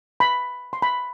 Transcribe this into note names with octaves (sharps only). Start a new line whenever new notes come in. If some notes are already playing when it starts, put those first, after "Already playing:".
B5
C6
B5